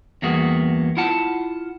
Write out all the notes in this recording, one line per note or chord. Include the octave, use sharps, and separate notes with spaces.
E2 G2 A#3 B3 F#4 G#4
E4 F4 F#5 A5